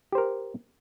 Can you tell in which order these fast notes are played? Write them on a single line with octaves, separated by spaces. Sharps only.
G4 C5 A#4